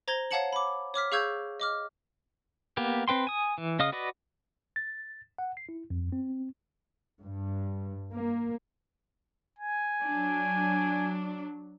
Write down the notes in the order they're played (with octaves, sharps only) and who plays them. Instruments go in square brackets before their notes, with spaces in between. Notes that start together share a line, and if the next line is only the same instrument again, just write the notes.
[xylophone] C5 A#5 G#6 A#6 G7
C#5 F5 F#5 A5 C#7 F#7
B5 D6
C#5 D6 F6 B6
G#4 F5 C#6 E6 G6 G#6
D#5 D6 F6
[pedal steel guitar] A#3 B3 G4
C4 B4 G5 C6
G#5 D#6
E3
C#3 D#5 F5 D#6
F#4 B4 D5 D#5
[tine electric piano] A6
F#5
C7
E4
F2
C4
[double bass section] G2
A#3
[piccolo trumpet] G#5
[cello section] F#3 D4